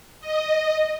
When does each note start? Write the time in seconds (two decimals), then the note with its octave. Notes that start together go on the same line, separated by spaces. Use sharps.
0.21 D#5